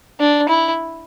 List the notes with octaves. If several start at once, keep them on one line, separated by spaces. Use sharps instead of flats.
D4
E4